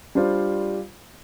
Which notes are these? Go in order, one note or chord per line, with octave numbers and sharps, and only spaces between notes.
G3 D4 F4 C5